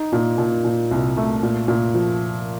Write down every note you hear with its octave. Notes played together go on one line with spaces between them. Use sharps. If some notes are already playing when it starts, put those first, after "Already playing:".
Already playing: D#4
A#2
A#2
A#2
C2
A3
A#2
A#2
F3